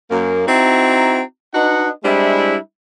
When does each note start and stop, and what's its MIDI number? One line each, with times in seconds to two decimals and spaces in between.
0.11 0.45 42
0.11 0.45 58
0.47 1.21 60
0.47 1.21 63
0.47 1.21 64
0.47 1.21 66
0.47 1.21 82
1.54 1.89 62
1.54 1.89 63
1.54 1.89 66
1.54 1.89 71
1.54 1.89 75
1.54 1.89 78
2.04 2.57 55
2.04 2.57 56
2.04 2.57 60
2.04 2.57 62
2.04 2.57 64